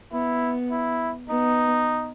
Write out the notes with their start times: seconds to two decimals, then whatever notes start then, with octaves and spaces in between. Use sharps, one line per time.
0.12 B3 E4
0.71 E4
1.29 B3 D#4